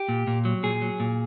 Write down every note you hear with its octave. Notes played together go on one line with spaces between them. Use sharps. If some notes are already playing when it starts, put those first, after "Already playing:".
Already playing: G4
A#2
A#2
F#3
A#2 G#4
F#3
A#2